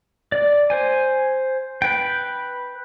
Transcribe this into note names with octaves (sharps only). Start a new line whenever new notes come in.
D5
C5 G#5
B4 G5